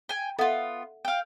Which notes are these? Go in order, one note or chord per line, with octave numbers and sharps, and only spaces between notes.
G5 G#5
B3 F4 A4 E5 F#5
F5 G5